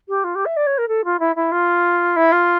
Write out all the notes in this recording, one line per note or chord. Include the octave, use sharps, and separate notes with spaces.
G4
F4
G4
E5
D5
C#5
A#4
A4
F4
E4
E4
F4
E4
F4